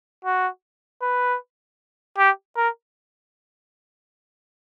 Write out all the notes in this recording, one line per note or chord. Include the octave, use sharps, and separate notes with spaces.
F#4
B4
G4
A#4